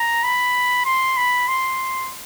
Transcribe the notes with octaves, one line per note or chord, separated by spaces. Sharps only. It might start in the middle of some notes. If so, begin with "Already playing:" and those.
Already playing: A#5
B5
C6
B5
C6